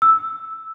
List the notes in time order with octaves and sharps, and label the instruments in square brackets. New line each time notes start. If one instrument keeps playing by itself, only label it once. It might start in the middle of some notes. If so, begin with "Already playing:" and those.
[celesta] E6